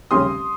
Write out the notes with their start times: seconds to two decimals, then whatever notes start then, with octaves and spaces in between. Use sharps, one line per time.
0.11 F1 D#2 C#3 G3 C#4 C6 D#6